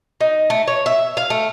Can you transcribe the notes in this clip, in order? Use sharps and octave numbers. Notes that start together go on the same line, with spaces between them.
D#4
A3
C#5
E5
F5
A3